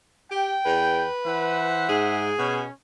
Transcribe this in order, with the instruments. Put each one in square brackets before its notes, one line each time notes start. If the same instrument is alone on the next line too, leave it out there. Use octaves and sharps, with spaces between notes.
[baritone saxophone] G4 [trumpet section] G5
[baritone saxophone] E2 [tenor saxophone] B4
[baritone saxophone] E3 [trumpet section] C5 E5 F#5
[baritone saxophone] G#2 [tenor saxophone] G#4
[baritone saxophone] B2 [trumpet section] C#4